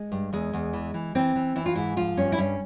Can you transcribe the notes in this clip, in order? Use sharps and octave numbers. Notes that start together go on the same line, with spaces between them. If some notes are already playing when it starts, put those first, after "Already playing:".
Already playing: G#3
G2
E2 G#3
E2
E3
E3
E3 C4
E3
E3 E4
F4
G#2 E4
F3 F4
G2 C#4
E4
G2 C#4